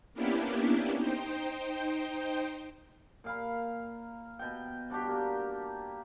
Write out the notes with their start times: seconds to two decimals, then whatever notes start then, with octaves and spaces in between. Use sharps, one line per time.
0.14 A#3 B3 C#4 D4 E4 G4
1.00 D#4 C5 G5
3.24 A#2 F5 B5
4.39 B2 G5
4.90 G3 D4 F#4 G4
5.08 A#3